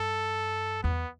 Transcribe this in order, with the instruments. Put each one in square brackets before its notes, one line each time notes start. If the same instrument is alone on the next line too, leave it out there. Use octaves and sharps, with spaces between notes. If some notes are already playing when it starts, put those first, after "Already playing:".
Already playing: [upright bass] G2 [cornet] A4
[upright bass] E2 [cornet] B3